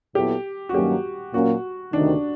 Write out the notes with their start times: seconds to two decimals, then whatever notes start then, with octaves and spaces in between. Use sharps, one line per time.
0.15 A#2 F#3 B3 E4 G4 A4
0.69 F#4
0.74 G2 D#3 F#3 A#3 C#4 G4
1.33 A#2 F#3 A#3 C#4 F#4
1.93 D2 C3 D#3 D4